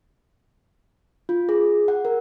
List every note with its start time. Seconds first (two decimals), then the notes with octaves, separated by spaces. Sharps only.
1.29 F4
1.49 G#4
1.88 F#5
2.05 A#4